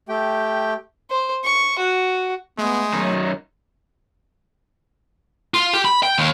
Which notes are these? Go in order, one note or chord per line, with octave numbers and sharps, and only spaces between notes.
A3 G4 G5
C5
C#6
F#4
G#3 A3 B3
F#2 D#3 F#3 D#4
F4
G4
B5
G5
D#2